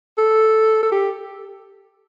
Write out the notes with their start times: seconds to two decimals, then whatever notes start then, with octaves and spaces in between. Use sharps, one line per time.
0.18 A4
0.83 A4
0.92 G4